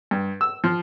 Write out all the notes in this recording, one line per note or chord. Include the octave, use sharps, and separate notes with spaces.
G2
E6
F3